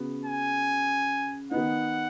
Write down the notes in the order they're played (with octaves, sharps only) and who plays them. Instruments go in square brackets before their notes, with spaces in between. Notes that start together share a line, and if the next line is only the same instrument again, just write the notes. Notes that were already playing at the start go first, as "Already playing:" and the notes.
Already playing: [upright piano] C#3 B3 F#4
[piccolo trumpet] G#5
[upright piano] D#3 B3 D#4 [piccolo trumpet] F#5